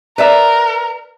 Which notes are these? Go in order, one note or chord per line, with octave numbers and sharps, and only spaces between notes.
A#4 B4 D5 E5